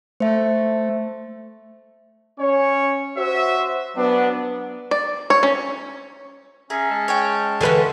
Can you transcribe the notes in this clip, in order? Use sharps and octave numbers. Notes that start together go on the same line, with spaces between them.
A3 C5 E5
C#4 C#5
F#4 C5 E5
F#3 B3 D4
D5
C#5
C#4
C#4 G#4 E5 A#5
G#3 A5
C#5 G5
D3 E3 C#4 B4 C6